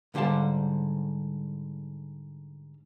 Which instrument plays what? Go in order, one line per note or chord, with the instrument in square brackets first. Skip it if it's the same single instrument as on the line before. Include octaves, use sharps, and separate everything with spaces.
[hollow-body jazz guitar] G#2 D3 G3 C5 F5 A5